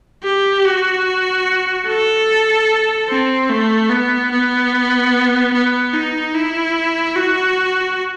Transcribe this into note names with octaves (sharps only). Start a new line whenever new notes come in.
G4
F#4
A4
C4
A3
B3
B3
B3
D#4
E4
F#4